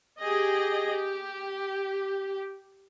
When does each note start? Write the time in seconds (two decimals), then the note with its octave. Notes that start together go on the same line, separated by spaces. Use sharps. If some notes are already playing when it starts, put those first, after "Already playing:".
0.19 G4 G#4 D#5
0.89 G4